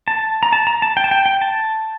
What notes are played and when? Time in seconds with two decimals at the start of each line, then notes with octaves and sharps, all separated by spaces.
0.08 A5
0.43 A#5
0.53 A5
0.67 A#5
0.82 A5
0.97 G5
1.04 A5
1.11 G5
1.26 G5
1.41 A5